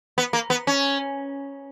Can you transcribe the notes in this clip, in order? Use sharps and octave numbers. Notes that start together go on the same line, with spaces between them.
B3
A#3
B3
C#4